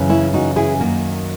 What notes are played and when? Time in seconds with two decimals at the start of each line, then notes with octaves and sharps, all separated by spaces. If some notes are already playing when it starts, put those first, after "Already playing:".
Already playing: F#2 C#3 E3
0.09 C#4 E4
0.34 D#4 F#4
0.56 E4 G#4
0.80 F#2 D#3 A#3